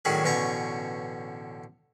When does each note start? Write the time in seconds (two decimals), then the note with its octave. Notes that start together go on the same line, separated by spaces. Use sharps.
0.05 A2 D#3 F#3 G3 C#4 G#4
0.24 A1 B2 D3 C#4 A#5 C#6